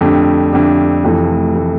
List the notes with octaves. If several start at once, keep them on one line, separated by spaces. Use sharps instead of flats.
F2 D3 A3 D4 G4
F2 D3 A3 D4 G4
F1 F2 E3 A3
E3 A3